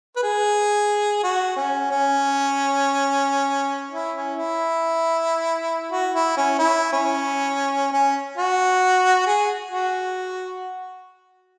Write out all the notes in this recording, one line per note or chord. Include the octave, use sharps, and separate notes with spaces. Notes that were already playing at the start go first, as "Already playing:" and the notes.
B4
G#4
F#4
C#4
C#4
E4
C#4
E4
F#4
E4
C#4
E4
C#4
C#4
F#4
G#4
F#4